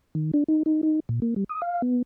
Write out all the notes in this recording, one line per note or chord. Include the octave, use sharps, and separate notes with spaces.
D#3
D4
D#4
D#4
D#4
A#2
A#3
G3
D#6
F5
B3